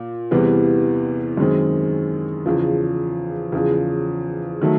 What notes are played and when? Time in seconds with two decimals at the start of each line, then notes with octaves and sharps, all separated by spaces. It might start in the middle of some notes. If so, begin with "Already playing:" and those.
Already playing: A#2
0.31 E2 C3 E3 G3 B3
1.37 F#2 D#3 G#3 C4
2.46 E2 C#3 F3
3.52 E2 C#3 F3
4.61 D#3 F#3 A3